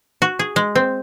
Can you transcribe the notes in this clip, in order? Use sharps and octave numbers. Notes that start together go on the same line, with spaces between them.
F#4
G#4
G#3
C4